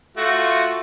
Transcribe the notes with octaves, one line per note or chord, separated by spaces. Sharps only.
A3 F4 F#4